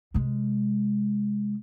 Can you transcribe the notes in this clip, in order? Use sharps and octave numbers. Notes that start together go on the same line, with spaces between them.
C3 G#3